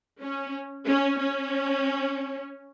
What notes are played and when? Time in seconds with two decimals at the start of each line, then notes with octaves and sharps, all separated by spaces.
0.21 C#4
0.87 C#4
1.20 C#4